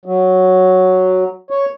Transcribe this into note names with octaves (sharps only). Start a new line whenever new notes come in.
F#3
C#5